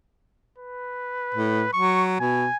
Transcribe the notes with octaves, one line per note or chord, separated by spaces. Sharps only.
B4
A2
F#3 C#6
B2 G#5